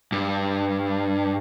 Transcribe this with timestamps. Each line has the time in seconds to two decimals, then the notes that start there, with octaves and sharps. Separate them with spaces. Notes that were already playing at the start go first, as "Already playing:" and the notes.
0.12 G2